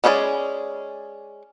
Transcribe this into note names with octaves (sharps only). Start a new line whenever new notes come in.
G#3 C#4 G#4 B4 D5